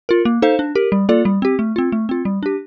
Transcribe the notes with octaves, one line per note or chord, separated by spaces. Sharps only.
F4 A#4
A#3
D#4 A4 C5 F5
D4
G4 A#4
G3
A#3 F4 A4 D5
G3
C4 G4
A3
C4 F4
A3
C4 F4
G3
D4 G4